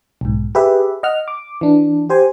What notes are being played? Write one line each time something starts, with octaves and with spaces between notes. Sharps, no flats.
B1 G#2
G4 G#4 B4 E5
D#5 F#5 F6
D6
E3 D4
G4 C5 G#5